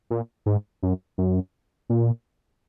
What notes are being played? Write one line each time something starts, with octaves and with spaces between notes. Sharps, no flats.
A#2
G#2
F#2
F#2
A#2